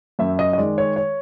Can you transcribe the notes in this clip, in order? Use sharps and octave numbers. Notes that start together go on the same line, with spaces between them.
F#2 E5
D#5
D#5
D#3 G#3 D5
C#5
C#5